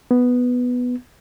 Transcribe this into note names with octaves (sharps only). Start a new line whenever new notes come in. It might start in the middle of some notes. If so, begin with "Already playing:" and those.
B3